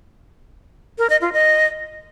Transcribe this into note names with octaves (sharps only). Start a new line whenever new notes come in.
A#4
D#5
F4
D#5